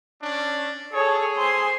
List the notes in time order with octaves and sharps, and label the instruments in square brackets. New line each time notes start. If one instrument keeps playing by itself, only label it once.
[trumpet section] C#4 D4
[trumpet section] G#4 [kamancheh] A4 C#5
[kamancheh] C5 G#5 [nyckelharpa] C6